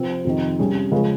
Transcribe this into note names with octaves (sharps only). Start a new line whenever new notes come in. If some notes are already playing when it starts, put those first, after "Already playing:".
Already playing: C3 F3 C4
F2 C3 D#3
C3 G3 C#4 G#4
C#3 F3 G#3 C#4 G#4